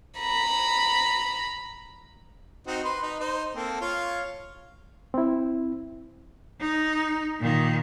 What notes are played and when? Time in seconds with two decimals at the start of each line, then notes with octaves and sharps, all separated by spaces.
0.19 A#5 B5
2.67 C4 D#4 F#4
2.84 B4 C6
3.03 D#4
3.20 D#4 C5
3.55 A#3 C4 A4
3.81 F4 C#5 F5
5.14 C4 E4
6.60 D#4
7.40 A#2 D#3